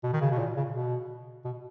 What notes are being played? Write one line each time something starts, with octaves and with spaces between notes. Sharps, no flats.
B2
D#3
C#3
B2
A#2
C#3
B2
B2